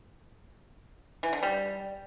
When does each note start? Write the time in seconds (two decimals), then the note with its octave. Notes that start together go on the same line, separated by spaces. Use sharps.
1.23 E3
1.33 D3
1.43 G3